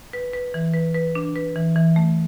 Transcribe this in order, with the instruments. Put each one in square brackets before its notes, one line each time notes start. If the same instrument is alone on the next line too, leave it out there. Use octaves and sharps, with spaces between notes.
[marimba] B4
B4
E3
B4
B4
D4
B4
E3
E3
A3